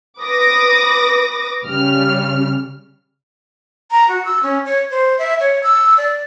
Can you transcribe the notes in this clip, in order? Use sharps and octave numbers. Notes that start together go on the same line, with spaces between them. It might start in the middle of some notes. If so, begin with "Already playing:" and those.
B4 D6 D#6 A#6
C#3 G3 F6
A#5
F#4
E6
C#4
C#5
C5
E5
C#5
E6
D5